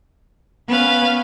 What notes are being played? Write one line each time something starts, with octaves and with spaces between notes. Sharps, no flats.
B3 C#4 B4 F5